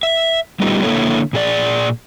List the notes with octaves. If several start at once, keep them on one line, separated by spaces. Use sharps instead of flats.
E5
G3 A3 B3 D#4 F4 G4
D3 A#3 E4 A4 C#5
A#2 G#4 D5